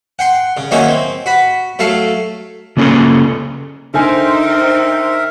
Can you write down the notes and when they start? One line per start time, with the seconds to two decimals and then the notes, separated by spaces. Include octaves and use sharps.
0.19 F#5 G5 C6
0.57 C#3
0.71 D#3 F#3 A#3 C#4 D#4 E4
0.88 C4
1.26 F#4 B5
1.79 F#3 A3 A4 F5
2.77 C#3 A#3 C#4 F#4 G#4 A4
3.94 D3 D#4 A#4 C5 E5 G5 G#5